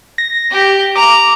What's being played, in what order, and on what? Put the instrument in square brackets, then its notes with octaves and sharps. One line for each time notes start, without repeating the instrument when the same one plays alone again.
[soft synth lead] A#6
[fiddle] G4
[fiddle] A#5 [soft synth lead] D6